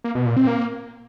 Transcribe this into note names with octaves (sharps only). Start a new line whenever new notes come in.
A#3
B2
A#2
C4
A#3